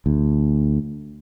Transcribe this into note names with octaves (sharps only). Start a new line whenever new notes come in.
D2